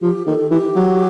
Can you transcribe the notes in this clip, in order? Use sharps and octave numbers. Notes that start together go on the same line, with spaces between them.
F3 G4
D#3 A4
E3 G4
F#3